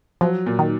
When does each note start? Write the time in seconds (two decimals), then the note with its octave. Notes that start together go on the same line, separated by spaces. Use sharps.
0.21 F3 F#3
0.46 A#2
0.59 D#3